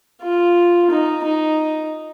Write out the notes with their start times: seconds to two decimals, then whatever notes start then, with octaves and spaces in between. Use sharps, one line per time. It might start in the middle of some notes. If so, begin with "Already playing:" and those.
0.22 F4
0.90 D#4
1.24 D#4